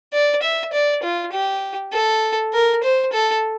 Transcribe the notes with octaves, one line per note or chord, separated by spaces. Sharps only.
D5
E5
D5
F4
G4
A4
A#4
C5
A4